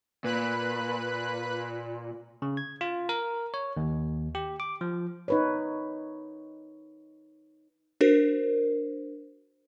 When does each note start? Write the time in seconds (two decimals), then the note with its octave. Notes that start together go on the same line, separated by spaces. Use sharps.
0.24 A#2 B4 B5 F#6
2.42 C#3
2.57 G#6
2.81 F4
3.09 A#4
3.54 C#5
3.77 D#2
4.35 G4
4.60 D6
4.81 F3
5.28 D#4 B4 C#5
8.01 D4 F#4 A#4 C5